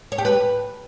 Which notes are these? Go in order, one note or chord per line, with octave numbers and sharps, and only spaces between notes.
C#5
G4
B4